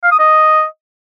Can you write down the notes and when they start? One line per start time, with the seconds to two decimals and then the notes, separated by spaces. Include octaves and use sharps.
0.03 F5
0.11 D#6
0.19 D#5